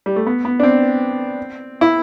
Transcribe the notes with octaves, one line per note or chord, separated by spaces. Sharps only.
G3
A3
B3
B3
D4
C4
E4